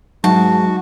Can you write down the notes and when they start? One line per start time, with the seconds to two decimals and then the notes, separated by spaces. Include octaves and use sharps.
0.24 G#2 F#3 F#4 A5